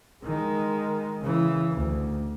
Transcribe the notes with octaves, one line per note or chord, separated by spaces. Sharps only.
D#3 G#3
C#3 E3
D2